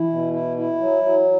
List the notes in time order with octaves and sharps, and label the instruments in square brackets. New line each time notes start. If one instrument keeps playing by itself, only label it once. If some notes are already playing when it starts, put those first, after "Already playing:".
Already playing: [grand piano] E3 [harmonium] E4
[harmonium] B2
E4
E4
F#3
F#3